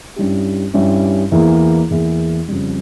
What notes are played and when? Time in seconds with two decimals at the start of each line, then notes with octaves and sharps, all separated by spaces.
0.16 G2 G3 C#4 E4 G4
0.74 G2 G3 C#4 E4 G4
1.32 E2 E3 A#3 E4 G#4
1.90 E2 E3 A#3 E4 G#4
2.48 F2 C#3 G3